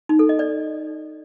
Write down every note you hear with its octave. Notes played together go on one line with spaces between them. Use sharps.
D#4
A4
D#5
D5